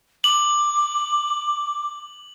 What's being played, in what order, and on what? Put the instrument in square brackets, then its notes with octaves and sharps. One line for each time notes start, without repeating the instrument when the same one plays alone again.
[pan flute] D6 [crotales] F#7